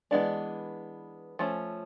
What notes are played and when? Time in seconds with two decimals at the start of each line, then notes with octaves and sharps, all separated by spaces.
0.11 E3 G#3 B3 D4
1.39 F3 A3 C#4